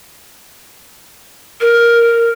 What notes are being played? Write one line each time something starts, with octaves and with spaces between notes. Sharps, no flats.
A#4